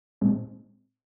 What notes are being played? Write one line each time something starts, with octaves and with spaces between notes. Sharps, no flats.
A#2 G#3 C4 D#4